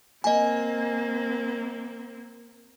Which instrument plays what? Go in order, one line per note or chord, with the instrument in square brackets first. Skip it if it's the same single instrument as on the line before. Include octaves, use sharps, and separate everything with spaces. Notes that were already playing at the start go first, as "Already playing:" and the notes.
[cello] A#3 C4 [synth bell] D#5 G#5